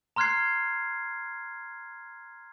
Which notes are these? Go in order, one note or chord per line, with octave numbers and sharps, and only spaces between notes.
A#5 C6 F6 F#6 G#6 C7